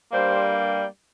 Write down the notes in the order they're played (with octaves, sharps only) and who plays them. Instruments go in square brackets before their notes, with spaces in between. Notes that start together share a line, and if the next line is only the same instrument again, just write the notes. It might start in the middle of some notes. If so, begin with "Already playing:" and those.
[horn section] G2 G3 A#3 C5